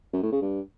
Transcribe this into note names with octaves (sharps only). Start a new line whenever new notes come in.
F#2
A2
C#3
G2